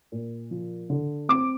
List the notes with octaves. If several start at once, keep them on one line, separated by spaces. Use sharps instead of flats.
A#2
F3
D3
C4 D6